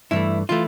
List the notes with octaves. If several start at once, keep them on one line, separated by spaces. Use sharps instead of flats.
G2 E3 A3 E4
E3 A3 F4